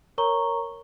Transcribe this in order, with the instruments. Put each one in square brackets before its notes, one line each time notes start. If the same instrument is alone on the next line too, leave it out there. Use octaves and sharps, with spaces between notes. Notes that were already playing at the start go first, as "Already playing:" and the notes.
[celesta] A#4 C#5 A#5 C#6 G7